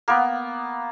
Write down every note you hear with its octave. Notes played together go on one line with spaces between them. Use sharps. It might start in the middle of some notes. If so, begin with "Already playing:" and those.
A#3 B3